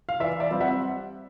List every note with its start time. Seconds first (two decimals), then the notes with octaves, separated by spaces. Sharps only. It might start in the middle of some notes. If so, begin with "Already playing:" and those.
0.09 F5
0.20 E3 D5 E5
0.40 D5 E5
0.51 G3 C4 F4
0.60 E5 F#5